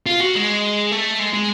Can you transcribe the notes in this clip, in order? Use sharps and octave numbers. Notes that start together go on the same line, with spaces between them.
F4
F#4
G#3
A3
G#3
G#3